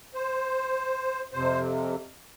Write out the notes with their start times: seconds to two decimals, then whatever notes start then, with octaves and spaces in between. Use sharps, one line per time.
0.14 C5
1.33 F2 C3 C5